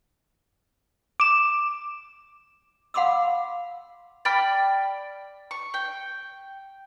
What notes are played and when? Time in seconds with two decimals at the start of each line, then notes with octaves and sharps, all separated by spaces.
1.20 D6 E7
2.94 F5 F#5 B5 C6 D6 E6
4.25 D5 G5 B5 F6
5.51 C#6
5.74 G5